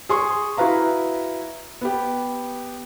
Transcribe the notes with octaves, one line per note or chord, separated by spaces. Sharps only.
G#4 C6 C#6
E4 F#4 B4 F5 A#5
B3 G4